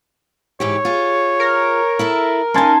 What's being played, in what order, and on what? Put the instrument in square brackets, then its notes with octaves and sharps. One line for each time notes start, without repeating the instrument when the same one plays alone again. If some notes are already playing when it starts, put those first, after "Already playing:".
[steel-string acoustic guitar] G#2 E3 G4 [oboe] C#5
[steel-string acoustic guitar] F4 G#4
[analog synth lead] A#4
[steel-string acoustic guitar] E4 A4 E5
[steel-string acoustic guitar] C#4 D#4 [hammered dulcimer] G#5 A5 C6